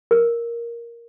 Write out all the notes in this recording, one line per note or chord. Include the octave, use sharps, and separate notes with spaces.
A#4